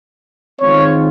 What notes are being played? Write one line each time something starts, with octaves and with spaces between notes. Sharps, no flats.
D#3 G#3 C4 F4 C#5